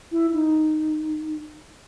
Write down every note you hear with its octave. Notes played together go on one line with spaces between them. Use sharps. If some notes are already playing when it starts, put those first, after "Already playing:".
E4
D#4